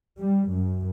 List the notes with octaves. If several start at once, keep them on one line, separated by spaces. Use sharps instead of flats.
G3
F#2